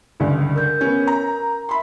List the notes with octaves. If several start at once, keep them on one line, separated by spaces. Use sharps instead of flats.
C#2 G2 D3
A#4 G6
B3 C#4
A#5
E5 B5 C6